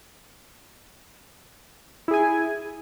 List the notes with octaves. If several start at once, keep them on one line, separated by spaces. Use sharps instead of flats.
E4 G#4 G#5